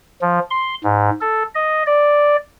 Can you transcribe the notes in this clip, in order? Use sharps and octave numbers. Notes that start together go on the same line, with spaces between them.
F3
C6
G#2
A4
D#5
D5